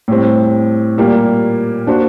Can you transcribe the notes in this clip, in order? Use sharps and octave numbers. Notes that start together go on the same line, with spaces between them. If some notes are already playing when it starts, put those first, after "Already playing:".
A2 G3 C4
A#2 G3 A#3
A#3 D4 F#4 C5